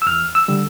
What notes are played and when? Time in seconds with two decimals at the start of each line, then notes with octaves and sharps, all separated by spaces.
0.02 E6
0.06 E2 F6
0.35 E6
0.48 D3 G3